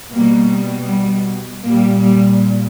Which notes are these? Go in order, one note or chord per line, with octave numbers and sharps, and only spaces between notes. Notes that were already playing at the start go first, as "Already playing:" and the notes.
B2 G3 A#3
G3
A#2 G3 A#3
G3